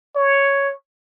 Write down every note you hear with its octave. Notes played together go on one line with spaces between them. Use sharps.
C#5